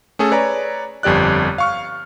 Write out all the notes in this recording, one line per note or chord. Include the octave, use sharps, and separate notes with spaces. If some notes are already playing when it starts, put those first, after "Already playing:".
A3 C#4 G#4 A4
B4 C#5 D5 G#5 A#5
G1 F2 G4 D5 F#6
F5 C#6 F6